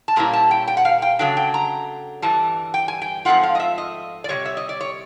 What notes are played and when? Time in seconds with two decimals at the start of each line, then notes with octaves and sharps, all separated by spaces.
0.08 A5
0.16 A#2 G3 A#3 C#4 E4 A#5
0.33 A5
0.51 G5
0.68 G5
0.77 F#5
0.85 F5
1.02 G5
1.19 C#3 F#3 A3 D4 G5
1.37 G5
1.54 A#5
2.22 G2 E3 G3 A5
2.74 G5
2.88 G#5
3.02 G5
3.25 G#2 F3 A3 C4 F4 F#5
3.43 F5
3.55 D#5
3.60 E5
3.78 D#5
4.24 D5
4.29 C3 E3 G3 C#5
4.45 E5
4.57 D#5
4.69 D5
4.81 C#5